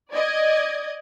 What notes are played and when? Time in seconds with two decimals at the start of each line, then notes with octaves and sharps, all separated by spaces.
0.13 D5 D#5 G#6